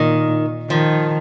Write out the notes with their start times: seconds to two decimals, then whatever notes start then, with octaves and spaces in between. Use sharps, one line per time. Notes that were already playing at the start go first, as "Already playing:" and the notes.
Already playing: A#2 D#3
0.70 D#3 F3